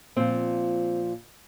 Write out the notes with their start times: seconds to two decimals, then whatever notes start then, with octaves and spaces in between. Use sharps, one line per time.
0.16 A#2 F3 C4